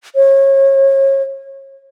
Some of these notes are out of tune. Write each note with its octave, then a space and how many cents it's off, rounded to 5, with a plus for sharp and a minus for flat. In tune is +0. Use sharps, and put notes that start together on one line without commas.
C#5 -30